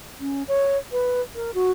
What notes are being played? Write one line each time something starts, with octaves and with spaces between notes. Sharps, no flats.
C#4
C#5
B4
A#4
F#4